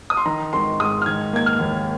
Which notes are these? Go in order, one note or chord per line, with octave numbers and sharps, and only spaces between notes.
D#6
C6
D#3 A#5
G#1 C6
G#2 D#6
F6
D#3 G#6
A#3 G#6
F6
D#2